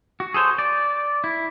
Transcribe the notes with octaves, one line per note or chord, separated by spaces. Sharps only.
F#4
G#4 A4 C5 C#5
D5
E4